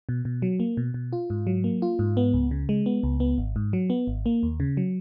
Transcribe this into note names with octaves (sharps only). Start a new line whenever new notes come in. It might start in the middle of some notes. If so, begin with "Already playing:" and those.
B2
B2
F#3
A#3
B2
B2
F4
G#2
F#3
A#3
F4
G#2
B3
C#2
C#3
G#3
B3
C#2
B3
G#1
G#2
F#3
B3
G#1
A#3
D#2
C#3
F#3